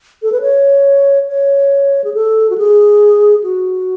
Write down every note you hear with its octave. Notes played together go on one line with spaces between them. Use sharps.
A4
B4
C#5
C#5
G#4
A4
F#4
G#4
F#4